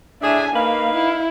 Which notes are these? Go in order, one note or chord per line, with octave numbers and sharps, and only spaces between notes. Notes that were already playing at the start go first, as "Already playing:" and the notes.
A2 D4 G#4 E5 G#5
A#3 D#4 B4 F5
E4